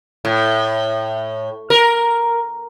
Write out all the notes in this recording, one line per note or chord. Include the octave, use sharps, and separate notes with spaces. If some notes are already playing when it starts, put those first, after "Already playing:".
A2
A#4